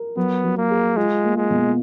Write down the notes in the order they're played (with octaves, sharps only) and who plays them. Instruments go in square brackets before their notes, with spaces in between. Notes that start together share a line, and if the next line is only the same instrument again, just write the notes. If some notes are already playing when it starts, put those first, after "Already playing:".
Already playing: [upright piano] A#4
[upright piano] F#3 [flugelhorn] B3
[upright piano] F#3
[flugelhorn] A#3
[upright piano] G#4
[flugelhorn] G#3 [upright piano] F4
[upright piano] A#3
[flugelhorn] G#3
[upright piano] B2